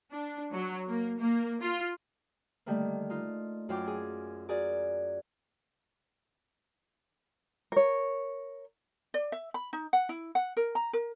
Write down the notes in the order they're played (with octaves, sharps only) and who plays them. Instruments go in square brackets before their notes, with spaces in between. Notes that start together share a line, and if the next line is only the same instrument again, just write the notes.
[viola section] D4
F#3
A#3
A#3
F4
[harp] D3 D#3 G3 A3 A#3
D#4 F4
F#2 F#3 F4 G5 D6
G#4
F#4 G#4 A#4 D5
[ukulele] A#4 C#5
D5
E5
B5
D#4
F#5
E4
F#5
A#4
A#5
A#4